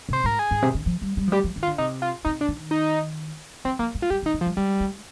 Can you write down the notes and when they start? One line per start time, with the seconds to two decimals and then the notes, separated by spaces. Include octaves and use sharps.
0.09 C3 C5
0.24 G#2 A#4
0.39 G#4
0.51 G#2
0.62 C3
0.75 D3
0.86 F3
1.02 G3
1.17 G3
1.28 F3
1.32 G3 G4
1.44 F3
1.56 D#3
1.63 F4
1.68 D3
1.78 C3 D#4
2.02 F4
2.25 C3 D#4
2.41 D4
2.48 D#3
2.71 D#4
3.65 F3 C4
3.79 F3 A#3
3.95 G#3
4.02 F4
4.10 G3 G4
4.22 D#3
4.26 D#4
4.34 D#3
4.41 F3
4.46 G3
4.57 G3 G#3
4.80 G#3